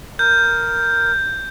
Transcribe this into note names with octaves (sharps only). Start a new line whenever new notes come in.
A#4 G6